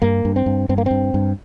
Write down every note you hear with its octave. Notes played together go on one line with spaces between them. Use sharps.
G2 A#3
G2
C4
G2
G2 C4
A#3
G2 C4
G2